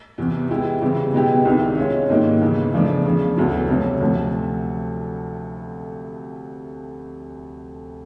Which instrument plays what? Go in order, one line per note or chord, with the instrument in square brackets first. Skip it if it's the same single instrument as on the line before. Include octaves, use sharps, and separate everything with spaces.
[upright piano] E2 C3 E3
G#3 B3 E4 G4
C#3 E3 G3 C4
B2 G#3 B3 E4 G4
C2 C3 D#3
G#3 C#4 F4
G#2 D#3 G3 A#3 D#4
E2 C#3 E3
E2 C#3 F3 A3 D4
E2 C#3 F3
D2 D3 F#3 B3 E4
F2 C3 F3 A3 C#4
D2 C3 F3 A3